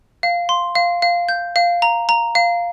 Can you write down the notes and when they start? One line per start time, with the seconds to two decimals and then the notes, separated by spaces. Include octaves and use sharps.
0.23 F5
0.49 C6
0.75 F5
1.02 F5
1.29 G6
1.56 F5
1.82 A#5
2.09 A#5
2.35 F5